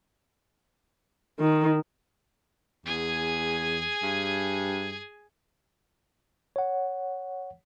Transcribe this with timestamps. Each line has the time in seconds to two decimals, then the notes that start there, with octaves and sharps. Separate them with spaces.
1.40 D#3
2.86 E2 G#4 G#5
4.03 G2
6.56 C#5 F#5